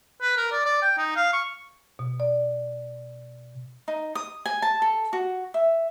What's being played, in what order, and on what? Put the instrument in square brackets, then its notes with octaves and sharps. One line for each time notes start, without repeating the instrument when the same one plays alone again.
[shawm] B4
A#4
D5
D5
G5
D#4
F5
C#6
[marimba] B2
D5
[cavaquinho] D#4
D#6
G#5
A5
A4
F#4
E5